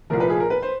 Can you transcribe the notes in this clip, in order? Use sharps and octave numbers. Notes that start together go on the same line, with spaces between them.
C2 A#2 F3 A3 A#4
B4
G#4
A#4
B4
C5